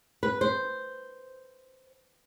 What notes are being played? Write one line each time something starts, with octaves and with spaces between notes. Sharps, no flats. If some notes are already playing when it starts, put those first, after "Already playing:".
B4
C5